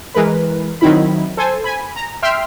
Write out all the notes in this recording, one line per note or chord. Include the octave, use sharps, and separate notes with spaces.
E3 G#3 A#4 B4
D#3 F#3 C4 D#4 E4 B5
A4 C5 G#5
G#5 B5
A#5
E5 G5 C6 F6